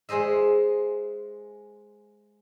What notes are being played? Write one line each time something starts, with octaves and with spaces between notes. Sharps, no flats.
G#3 G#4 C5 D#5 E5